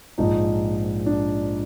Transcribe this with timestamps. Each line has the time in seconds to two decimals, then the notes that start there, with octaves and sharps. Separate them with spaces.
0.18 A#1 G#2 F3 D#4
1.06 D4